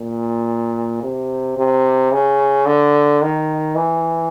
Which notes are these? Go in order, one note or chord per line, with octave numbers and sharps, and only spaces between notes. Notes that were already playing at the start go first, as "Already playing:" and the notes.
Already playing: A#2
C3
C3
C#3
D3
D#3
E3